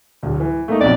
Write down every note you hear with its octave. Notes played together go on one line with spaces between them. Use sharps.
D1 D2
E3
A3 A#3 D#4
B1 F2 D5